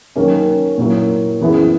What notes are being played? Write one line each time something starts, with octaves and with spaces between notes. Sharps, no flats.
D#3 F#3 A#3 C#4
A#2 F#3 A#3 E4
F#2 E3 B3 E4 G#4